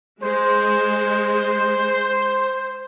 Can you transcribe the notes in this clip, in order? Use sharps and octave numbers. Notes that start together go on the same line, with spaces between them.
G#3 C5